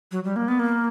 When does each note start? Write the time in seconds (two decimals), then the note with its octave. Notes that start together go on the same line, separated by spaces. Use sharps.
0.12 F#3
0.24 G3
0.36 A#3
0.48 B3
0.59 A#3